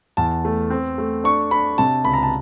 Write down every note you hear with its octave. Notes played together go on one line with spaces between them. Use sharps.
E2 A5
A3
C4
A3
D4 C#6
D4 B5
C3 A5
C#2 B5
A#5
A5